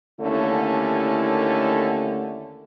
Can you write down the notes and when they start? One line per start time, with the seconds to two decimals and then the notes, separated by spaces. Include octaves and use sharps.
0.20 D#2 D3 A3 C#4 E4